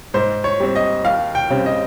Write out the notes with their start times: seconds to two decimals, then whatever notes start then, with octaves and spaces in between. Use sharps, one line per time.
0.14 G#2 C5
0.44 C#5
0.60 G3 C4
0.76 D#5
1.05 D#2 F5
1.35 G5
1.50 C#3 G3 C4
1.66 D#5